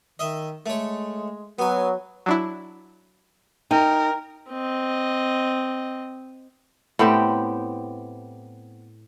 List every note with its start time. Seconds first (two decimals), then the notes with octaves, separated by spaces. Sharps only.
0.19 D#3 D#5 E5
0.66 G#3 A3 C#5
1.59 F#3 B3 G#5
2.26 F#3 D4 E4
3.71 D#4 A#4 G5
4.50 C4 D#5
6.99 A2 B3 C4 G4